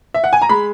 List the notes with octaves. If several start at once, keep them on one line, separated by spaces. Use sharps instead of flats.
E5
F#5
G#5
A#5
G#3 B5